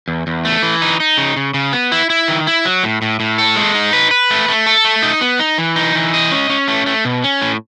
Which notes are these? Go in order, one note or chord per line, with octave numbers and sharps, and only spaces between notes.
E2
E2
A3
E3
D#4
D#4
C#3
C#3
C#3
B3
E4
E4
D#3
E4
F#3
A2
A2
A2
A4
G#3
D#4
B4
B4
A3
A3
A4
A3
D#4
B3
D#4
E3
D#4
E3
D#5
C#4
C#4
A3
A3
B2
C#4
A2